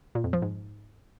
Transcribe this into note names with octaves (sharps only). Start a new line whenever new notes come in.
A#2
F2
F3
G#2